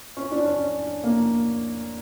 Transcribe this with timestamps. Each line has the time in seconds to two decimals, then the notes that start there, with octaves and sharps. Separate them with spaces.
0.17 C#4
0.32 D4
0.45 C#4
1.04 A#3